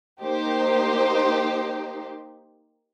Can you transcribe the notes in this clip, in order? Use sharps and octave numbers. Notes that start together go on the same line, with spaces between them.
A#3 D#4 G4 C5